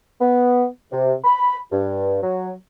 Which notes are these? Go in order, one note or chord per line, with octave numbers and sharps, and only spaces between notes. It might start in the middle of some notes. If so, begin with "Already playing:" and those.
B3
C3
B5
G2
F#3